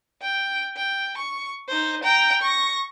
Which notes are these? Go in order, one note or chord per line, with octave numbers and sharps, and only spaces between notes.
G5
G5
C#6
D#4 C5
G5 A#5
C#6 A#6